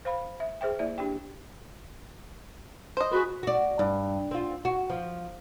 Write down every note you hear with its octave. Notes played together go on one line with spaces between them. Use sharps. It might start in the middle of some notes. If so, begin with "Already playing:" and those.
C5 F5 B5
E5
G#4 C5 E5 G5
A#3 E4 D5 E5
D4 G4 G5
C5 D#5
F#4 G#4 B4
F#4 D5
G2
C4 F4
F#4
F3